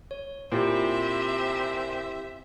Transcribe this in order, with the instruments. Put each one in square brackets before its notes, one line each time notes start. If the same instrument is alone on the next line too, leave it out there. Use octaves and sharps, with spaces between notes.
[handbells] C#5
[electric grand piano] A#2 [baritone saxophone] C4 [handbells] E4 G4 C5 [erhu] E5